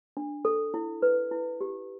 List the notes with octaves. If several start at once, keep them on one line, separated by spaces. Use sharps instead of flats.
D4
A4
E4
B4
E4
G4